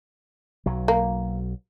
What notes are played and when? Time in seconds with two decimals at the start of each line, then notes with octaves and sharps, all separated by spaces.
0.66 B1 F#3
0.88 A#3